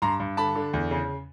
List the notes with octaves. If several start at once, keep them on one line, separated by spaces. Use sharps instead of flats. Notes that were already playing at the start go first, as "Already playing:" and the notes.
G2 A#5 C6
G2
D3 A5 B5
D3
E2
C#3